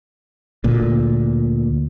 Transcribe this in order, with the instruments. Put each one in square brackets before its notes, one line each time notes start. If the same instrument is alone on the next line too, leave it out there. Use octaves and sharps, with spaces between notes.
[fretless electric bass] D2 A#2